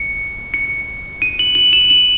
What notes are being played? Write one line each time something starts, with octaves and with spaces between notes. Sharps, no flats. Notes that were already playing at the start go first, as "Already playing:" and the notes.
Already playing: C#7
C#7
D#7
F#7
F#7
E7
F#7